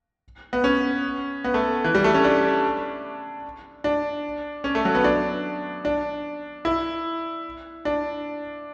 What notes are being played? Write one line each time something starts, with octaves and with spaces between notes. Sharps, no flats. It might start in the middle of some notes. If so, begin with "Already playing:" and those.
B3
C#4
B3
A3
E3
G3
A3
C#4
D4
D4
C#4
A3
F#3
B3
D4
D4
E4
D4